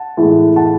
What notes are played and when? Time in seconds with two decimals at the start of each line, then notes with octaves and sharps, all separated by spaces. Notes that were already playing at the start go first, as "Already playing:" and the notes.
Already playing: F#5 A5
0.17 A2 E3 G#3
0.56 F#5 A5